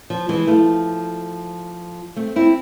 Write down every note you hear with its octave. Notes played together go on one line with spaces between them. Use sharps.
F3
E3 G#3
F3 A3
A3 C4
C4 E4